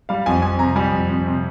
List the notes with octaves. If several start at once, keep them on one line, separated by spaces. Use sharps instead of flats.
G3 F5
F2 G#5
F2 G#5
C3 A#5
G3 G#5
F2
F2
C3